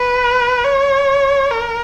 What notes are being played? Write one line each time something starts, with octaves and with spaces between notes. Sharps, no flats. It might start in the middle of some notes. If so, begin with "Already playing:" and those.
Already playing: B4
C#5
A#4